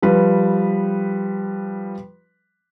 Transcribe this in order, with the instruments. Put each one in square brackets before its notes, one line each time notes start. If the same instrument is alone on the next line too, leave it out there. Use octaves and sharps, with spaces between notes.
[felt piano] F3 G3 B4